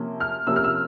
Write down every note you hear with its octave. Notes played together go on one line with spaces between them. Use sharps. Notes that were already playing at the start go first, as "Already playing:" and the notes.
Already playing: C3 F3 A#3 C#4
F6
C3 F3 A#3 C#4 E6
F6
E6